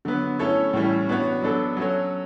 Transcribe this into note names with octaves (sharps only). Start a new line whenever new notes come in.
D3 F#3 B3
A3 C#4 E4 A4 C#5
A2 E3 G3 C#4 E4
E3 B3 D4 F#4 C#5
F#3 B3 D4 A4
F#3 C#4 F#4 A4 C#5